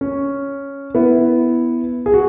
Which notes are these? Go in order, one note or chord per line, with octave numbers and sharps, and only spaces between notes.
C#4
B3 E4
G#4
F#4